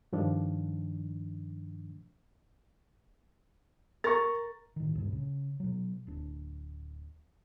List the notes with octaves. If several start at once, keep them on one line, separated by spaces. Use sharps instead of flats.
G2 D#3 F3 D4
A#4 C#6 A6
A2 D#3
C#2 G2 A#2
C#3
B2 F#3
D1 D4